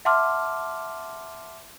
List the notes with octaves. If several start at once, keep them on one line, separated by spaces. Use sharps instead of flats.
E5 F#5 A5 C6 D6 F6